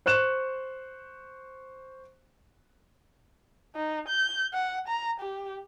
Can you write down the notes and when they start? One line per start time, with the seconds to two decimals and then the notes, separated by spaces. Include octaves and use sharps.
0.06 C5 C#6 F#6 E7
3.75 D#4
4.08 G6
4.53 F#5
4.88 A#5
5.20 G4